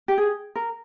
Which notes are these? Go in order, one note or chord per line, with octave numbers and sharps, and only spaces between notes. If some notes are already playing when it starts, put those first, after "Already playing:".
G4
G#4
A#4